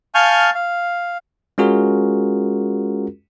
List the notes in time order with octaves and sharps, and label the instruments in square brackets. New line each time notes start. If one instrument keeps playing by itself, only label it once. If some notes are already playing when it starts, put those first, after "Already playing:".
[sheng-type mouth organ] F5 G#5 A5 C#6 F6 G6
F5
[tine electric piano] G#3 C#4 F4 F#4 G#4 A#4